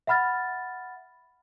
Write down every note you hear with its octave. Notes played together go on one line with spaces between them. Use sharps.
E5 F#5 B5 F6 A6